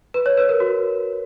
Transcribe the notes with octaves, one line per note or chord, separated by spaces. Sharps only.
B4
C#5
B4
A#4
F#4